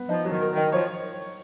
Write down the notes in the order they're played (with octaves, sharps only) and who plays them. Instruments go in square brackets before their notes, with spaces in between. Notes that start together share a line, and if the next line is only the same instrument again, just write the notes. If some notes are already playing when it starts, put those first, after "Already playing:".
Already playing: [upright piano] B3
[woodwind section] F3 [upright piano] D#4
[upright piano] F#3
[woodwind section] D#3
[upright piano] A#4
[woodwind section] D#3
[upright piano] D#4
[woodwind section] F3 [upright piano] C#5